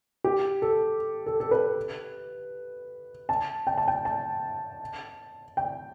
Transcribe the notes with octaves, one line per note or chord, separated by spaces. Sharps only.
G4
A4
A4
A4
B4
A5
G5
A5
G5
A5
G5